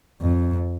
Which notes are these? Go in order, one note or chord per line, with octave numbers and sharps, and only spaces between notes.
F2